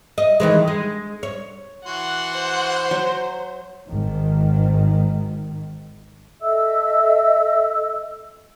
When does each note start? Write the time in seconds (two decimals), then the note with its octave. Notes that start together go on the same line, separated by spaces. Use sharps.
0.18 D#5
0.40 D#3 E3 G#3
0.68 G#3
1.23 C#5
1.87 E3 F#4 F#5 C6
2.33 C5
2.91 F#3
3.87 G#1 G#2 D#3
6.41 A4 D#5 E5 E6